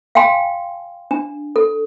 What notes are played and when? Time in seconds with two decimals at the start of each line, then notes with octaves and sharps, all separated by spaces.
0.15 F5 G5 G#5 C6
1.11 D4
1.56 A4